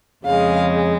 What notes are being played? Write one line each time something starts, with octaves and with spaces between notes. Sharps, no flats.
F2 C#3 G#3 F5